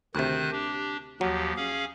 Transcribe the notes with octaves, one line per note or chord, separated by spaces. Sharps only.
D2 C3 D#3 C5 F#6
D4 G4
D#2 F3 F#3 G4
C#4 G#4 F5